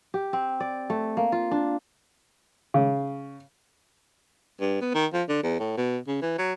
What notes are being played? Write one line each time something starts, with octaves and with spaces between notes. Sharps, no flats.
G4
C4
D5
A3
A#3
F4
D4
C#3
G2
B3
D#3
F3
D3
E2
A2
B2
C#3
E3
F#3